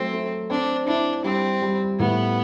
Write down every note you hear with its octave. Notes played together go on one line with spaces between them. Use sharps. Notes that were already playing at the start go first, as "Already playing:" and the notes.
Already playing: F#3 A3 C4
A3
C4 D4
D4 E4
G3 C4
G3
A2 B3